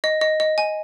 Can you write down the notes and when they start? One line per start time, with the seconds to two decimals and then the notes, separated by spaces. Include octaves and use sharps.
0.04 D#5
0.21 D#5
0.40 D#5
0.58 G#5